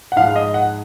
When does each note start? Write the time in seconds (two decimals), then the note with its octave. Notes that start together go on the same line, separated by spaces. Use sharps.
0.12 F#5
0.16 G#2 F3 G#3 F5
0.36 D#5
0.54 F#5